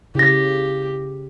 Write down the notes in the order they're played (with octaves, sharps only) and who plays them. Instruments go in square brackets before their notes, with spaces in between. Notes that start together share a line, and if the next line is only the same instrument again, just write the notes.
[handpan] C#3 [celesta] E4 A#6 [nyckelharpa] G4